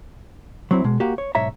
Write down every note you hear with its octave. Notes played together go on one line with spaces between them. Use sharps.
F#3 C4 E4
B2 G#3
A#3 F#4 G4
C#5
B1 G#2 C#5 E5 A#5